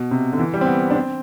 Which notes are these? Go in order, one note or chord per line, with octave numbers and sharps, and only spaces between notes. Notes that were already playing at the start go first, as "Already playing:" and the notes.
Already playing: B2
C3
D3
E3
G3
C4
B3
D4
C4